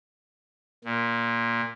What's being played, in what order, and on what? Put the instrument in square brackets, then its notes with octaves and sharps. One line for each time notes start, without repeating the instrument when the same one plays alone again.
[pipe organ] A#2